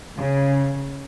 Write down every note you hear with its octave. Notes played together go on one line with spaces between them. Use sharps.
C#3